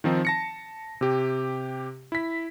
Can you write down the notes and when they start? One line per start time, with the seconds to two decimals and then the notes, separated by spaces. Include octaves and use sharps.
0.04 D#3 F3 C4 D#4
0.25 A5 A#6 C#7
1.01 C3 G4
2.12 E4 B6